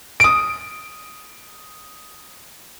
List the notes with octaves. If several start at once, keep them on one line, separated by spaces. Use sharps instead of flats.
D#6 D7